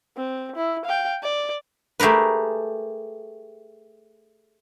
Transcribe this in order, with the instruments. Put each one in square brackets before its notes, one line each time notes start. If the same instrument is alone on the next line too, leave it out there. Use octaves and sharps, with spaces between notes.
[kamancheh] C4
E4
F5 G5
D5
[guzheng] A3 G4 G#4 A#4 B4